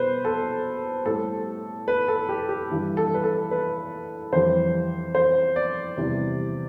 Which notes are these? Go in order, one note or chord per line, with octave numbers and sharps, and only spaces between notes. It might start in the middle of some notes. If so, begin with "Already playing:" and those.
Already playing: B2 G3 B4 C5
A4
A2 G3 A4
B4
A4
G4
G4
G2 E3 G3
A4
B4
A4
B4
F2 E3 G3 C5
C5
D5
E2 C3 E3 G3